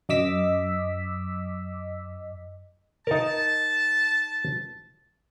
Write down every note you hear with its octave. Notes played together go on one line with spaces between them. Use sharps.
F#2 D#5 D6 E6 B6
D#4 A#4 A5